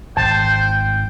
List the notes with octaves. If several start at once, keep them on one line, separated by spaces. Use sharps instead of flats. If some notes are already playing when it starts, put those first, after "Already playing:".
G#1 C5 G5 A5